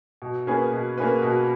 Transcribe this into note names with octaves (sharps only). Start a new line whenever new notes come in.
B2
A#3 C#4 G#4 B4
B2
A#3 C#4 G#4 B4
B2